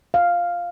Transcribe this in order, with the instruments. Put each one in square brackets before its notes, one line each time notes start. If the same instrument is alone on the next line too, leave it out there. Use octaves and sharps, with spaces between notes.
[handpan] F5